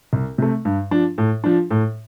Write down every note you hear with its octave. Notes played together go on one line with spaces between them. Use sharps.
C2
C3 A3
G2
F3 D4
A2
F3 D4
A2